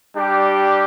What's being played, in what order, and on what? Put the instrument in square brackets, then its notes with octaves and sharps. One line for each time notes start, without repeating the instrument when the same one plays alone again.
[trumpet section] G3 D4 G4